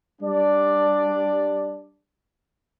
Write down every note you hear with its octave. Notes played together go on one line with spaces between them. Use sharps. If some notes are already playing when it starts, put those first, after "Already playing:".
G3 D4 D5